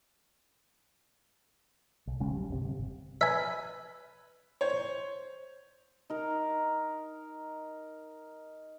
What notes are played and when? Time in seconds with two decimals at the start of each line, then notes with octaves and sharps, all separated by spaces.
2.07 B1
2.20 D#1 C#3 G#3 C#4
2.31 F#3 G3
2.48 F#1 B1 C3
2.63 G1 C3
3.21 B4 E5 G#5
4.61 C5 C#5
6.10 D#4 A#4